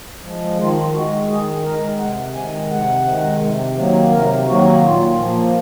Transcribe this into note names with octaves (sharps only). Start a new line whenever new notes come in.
F3 G#3
D#3 F4
G#3 F#4
D#3 G#4
G#3 A#4
C3 F#5
D#3 G#3 G#5
C3 F#5
D#3 G#3
C3
D#3 F#3 A#3
C3 A#4
D#3 F#3 A#3 F#4
A#2 F4
F3 A#3